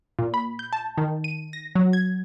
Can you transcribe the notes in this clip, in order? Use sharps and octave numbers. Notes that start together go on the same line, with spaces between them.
A#2
B5
G6
A5
D#3
D#7
A#6
F#3
G#6